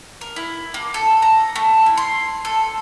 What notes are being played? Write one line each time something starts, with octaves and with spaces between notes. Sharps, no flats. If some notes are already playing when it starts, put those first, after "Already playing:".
A#4
E4
A#3
A4
A#5
A3
E4
C6
A4